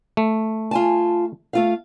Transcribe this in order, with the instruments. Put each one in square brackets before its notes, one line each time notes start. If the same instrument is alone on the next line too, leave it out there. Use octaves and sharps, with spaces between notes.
[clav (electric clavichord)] A3
[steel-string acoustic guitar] F4 G#5 A5
A3 F4 F5